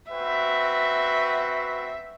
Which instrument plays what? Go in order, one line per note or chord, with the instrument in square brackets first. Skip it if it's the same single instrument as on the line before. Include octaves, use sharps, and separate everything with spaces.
[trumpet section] C4 F#4 B4 [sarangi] E5